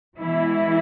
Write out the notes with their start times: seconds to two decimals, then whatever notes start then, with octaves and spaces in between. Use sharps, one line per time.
0.17 B2 E3 G#3 E4